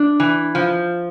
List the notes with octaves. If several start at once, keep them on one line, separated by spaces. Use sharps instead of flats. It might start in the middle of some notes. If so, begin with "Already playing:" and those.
Already playing: D4
E3
F3